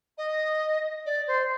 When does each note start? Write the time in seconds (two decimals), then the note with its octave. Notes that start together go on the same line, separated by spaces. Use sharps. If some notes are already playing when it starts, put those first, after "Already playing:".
0.17 D#5
1.05 D5
1.27 C5